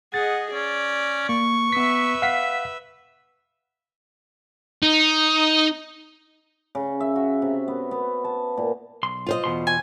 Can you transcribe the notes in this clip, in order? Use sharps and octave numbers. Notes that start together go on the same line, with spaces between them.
G#4 D#5 F#5 A6
C#4 D5
A#3 C#6
B3 B4 E5 B6
F5 F#5 B6
D#4
C#3
E5
F#4
C3
B3
B3
A5
A#2
B1 C6
F4 C5 D#5
E2 B2 C6
G#5